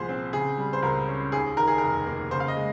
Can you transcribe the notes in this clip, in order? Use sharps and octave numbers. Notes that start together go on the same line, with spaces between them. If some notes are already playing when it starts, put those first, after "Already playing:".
Already playing: C2 A#2 F3 G#4 C5
C4
C#3 G#4
G3
C5
C#2 A#4
C#4
D#2 G#4
D#3 A#4
G#4
F1 A#4
A#3
C#3 C5
F5
D#5
G#3